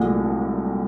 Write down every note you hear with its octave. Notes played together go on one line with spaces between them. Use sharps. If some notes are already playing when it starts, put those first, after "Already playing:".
Already playing: C2 A#2 F#3 G#3 A3